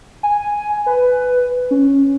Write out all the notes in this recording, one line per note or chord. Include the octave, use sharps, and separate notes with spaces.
G#5
B4
C#4